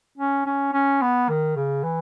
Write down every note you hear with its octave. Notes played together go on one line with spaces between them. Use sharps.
C#4
C#4
C#4
B3
D#3
C#3
E3